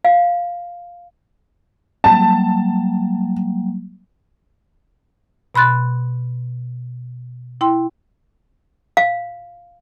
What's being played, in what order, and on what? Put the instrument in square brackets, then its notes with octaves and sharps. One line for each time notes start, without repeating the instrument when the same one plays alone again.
[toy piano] F5
[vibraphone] F#3 G3 A#3 [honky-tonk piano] A5
[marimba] B2 B5 C6 F#6 A6
E4 G5 C6
[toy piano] F5